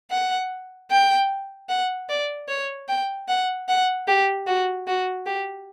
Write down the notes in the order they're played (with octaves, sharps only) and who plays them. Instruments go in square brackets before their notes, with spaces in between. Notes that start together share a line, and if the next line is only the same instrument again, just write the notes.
[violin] F#5
G5
F#5
D5
C#5
G5
F#5
F#5
G4
F#4
F#4
G4